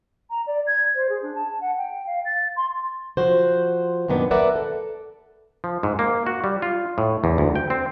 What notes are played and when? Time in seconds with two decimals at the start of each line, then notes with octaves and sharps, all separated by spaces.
0.30 A#5
0.47 D5
0.67 G#6
0.95 C5
1.09 G#4
1.22 D4
1.35 A5
1.61 F#5
1.78 G5
2.07 F5
2.25 A6
2.56 C6
3.17 F3 F#4 C5
4.08 F#2 A#2 D#3 B3 D4
4.31 A#4 B4 D5 E5 F#5
4.56 A4
5.64 F3
5.83 G#2
5.99 A#3
6.26 F#4
6.44 G3
6.62 F4
6.98 A2
7.24 E2
7.38 D2
7.55 G5
7.70 C4